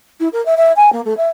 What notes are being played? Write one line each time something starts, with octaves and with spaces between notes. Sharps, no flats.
E4
A#4
E5
E5
G#5
A#3
A3
E5